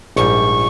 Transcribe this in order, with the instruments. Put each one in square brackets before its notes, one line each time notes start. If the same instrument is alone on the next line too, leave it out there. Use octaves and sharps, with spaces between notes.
[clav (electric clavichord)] A#1 G#2 G3 [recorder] C#6